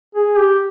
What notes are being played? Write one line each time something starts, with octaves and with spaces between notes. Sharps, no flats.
G#4
G4